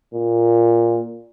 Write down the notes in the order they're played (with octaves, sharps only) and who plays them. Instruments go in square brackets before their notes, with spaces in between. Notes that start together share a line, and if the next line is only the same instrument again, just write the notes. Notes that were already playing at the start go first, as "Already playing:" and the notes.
[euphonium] A#2